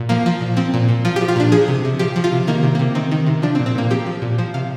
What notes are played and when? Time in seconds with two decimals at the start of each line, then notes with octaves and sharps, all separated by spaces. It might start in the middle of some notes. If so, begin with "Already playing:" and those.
Already playing: A#2
0.09 F3 A#3
0.26 F3
0.41 A#2
0.57 F3 C4
0.74 A#2
0.89 A#2
1.05 F3 F4
1.16 G4
1.21 F3
1.28 F4
1.36 A#2 D4
1.52 F3 G#4
1.68 C3
1.85 C3
1.99 F3 G4
2.16 F3
2.24 F4
2.32 C3
2.47 D#3 A#3
2.63 C3
2.75 C3 A#3
2.95 D#3 C4
3.11 D#3
3.26 C3
3.42 F3 D4
3.55 C4
3.59 A#2
3.66 C4
3.75 A#2 A#3
3.90 F3 G4
4.06 F3
4.22 A#2
4.38 F3 C5
4.54 C3 F5